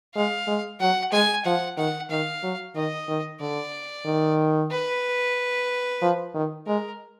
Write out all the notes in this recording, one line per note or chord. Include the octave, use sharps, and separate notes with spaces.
G#3 F5
G#3
F#3 F#5
G#3 G#5
F3 F#5
D#3 F#5
D#3 F5
F#3
D#3 D#5
D#3
D3 D5
D#3
B4
F3
D#3
G#3 A#4